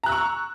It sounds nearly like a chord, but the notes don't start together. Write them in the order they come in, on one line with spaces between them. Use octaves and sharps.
A#5 F#6 E6 C#6